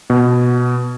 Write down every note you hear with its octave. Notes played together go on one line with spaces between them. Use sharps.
B2